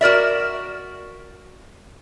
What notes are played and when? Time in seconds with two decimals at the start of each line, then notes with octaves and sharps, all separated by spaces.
0.01 F#4 A#4 D5 E5